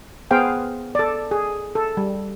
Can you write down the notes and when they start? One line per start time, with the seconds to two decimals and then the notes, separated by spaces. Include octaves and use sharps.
0.31 B3 G#4 C5 F5 G5
0.95 A4 D5
1.31 G#4
1.75 A4
1.97 G3